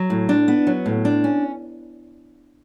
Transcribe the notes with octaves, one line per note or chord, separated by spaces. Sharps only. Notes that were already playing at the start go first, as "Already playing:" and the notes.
Already playing: F#3
A2
D4
B3
F#3
A2
D4
C#4